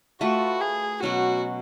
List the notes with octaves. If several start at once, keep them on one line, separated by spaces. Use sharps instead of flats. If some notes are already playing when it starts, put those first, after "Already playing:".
A3 F4 F#4 B4
G#4
B2 F#3 C#4 F#4